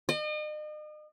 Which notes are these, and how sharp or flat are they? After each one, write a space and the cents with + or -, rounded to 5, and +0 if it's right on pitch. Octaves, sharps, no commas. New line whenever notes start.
D#5 -40